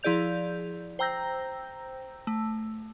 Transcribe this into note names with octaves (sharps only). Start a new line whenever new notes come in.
F3 E4 G#4 D5 G6 F7
C5 G5 A#5 E6 G6 A#6
A3